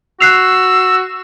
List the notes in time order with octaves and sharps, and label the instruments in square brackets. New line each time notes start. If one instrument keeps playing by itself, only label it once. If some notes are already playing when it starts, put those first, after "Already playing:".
[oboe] F#4 [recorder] E6 [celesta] F#6 C7 F7